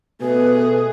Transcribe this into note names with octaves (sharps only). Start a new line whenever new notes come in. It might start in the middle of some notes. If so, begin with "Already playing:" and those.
B2 A3 G#4 B4